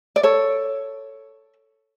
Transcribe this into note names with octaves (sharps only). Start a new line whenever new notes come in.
D5
A4 C#5